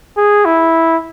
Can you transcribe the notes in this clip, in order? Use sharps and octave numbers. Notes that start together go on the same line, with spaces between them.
G#4
E4